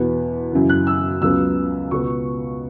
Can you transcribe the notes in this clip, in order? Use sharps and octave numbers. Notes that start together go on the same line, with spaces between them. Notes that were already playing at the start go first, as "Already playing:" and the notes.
Already playing: E2 B2 B3
F#2 C#3 E3
F#6
E6
C#2 C#3 F#3 B3 E6
C#2 B2 B3 C#6